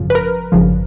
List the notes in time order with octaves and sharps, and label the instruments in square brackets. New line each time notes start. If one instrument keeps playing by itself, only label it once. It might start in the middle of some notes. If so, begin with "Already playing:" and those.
Already playing: [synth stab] G#1 F#2 C#3 F3
B4
A#4
G#1 F#2 C#3 F3